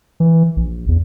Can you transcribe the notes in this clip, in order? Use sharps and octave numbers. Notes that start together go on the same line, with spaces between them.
E3
A#1
E2